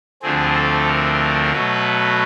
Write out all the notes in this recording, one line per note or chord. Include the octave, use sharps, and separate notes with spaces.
D2 D3 F3 A3 C4 G#4
A4
A#4
B2 F#3 A3 B4